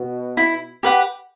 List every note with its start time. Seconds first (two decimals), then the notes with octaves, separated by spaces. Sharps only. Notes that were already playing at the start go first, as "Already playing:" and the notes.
Already playing: B2
0.37 E4
0.83 G4 B4 F#5